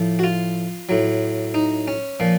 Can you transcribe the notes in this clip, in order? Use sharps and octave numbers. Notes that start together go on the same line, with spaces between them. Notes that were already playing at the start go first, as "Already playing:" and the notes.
Already playing: A2 F3
F#4
F4
A2 F#3
D#4
C#4
A#2 F3